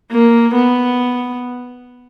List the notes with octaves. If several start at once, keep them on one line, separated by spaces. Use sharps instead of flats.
A#3
B3